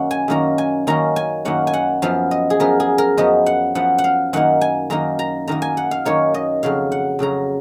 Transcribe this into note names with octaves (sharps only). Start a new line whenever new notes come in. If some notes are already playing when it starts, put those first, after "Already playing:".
Already playing: F#2 D#3 A#3 C#4 F#5
G#5
F#2 D#3 A#3 C#4 A#5
G#5
F#2 D#3 A#3 C#4 A#5
G#5
F#2 D#3 A#3 C#4 F#5
G#5
F#5
F#2 F3 B3 F5
D#5
G#4
F#2 F3 B3 A#4
G#4
A#4
F#2 F3 B3 D#5
F#5
F#2 F3 B3 F#5
F#5
F5
F#2 D#3 A#3 D#4 F#5
G#5
F#2 D#3 A#3 D#4 A#5
A#5
F#2 D#3 A#3 D#4 A#5
G#5
F#5
F5
F#2 D#3 A#3 D#4 C#5
D#5
F2 C#3 F#3 F5
F#5
F2 C#3 F#3 A#5